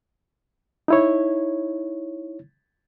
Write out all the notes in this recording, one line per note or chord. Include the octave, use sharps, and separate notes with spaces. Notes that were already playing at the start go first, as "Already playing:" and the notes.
D#4 E4 C#5